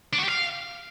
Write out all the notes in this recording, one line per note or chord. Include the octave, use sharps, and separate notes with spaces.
D4
F#4
G4
F5